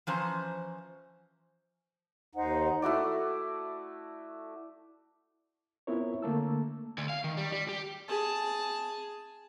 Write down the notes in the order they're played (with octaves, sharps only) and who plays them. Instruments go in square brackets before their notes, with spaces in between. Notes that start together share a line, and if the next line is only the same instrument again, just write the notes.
[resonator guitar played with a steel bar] E3 F3 C#4 C5 A#5
[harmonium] D#2 D#4 [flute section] C5 D#5 F#5
[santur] A3 E4 F#4 D5
[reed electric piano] B3 C4 E4 F4 A#4 C#5
D3 A3 A#3 A5 E6
[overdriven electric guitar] D2
F5
D#3
G3
G3
G4
[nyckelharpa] G#4 A5